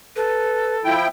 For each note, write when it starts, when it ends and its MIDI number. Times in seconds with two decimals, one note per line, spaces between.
0.16 0.94 69
0.16 0.77 71
0.85 1.08 53
0.85 1.08 64
0.85 1.08 79